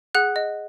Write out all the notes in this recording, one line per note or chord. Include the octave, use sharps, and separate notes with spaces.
G#4 F#5 F#6
D#5